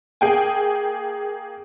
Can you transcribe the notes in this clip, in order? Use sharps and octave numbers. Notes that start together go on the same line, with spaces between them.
A#3 G#4 G5 G#5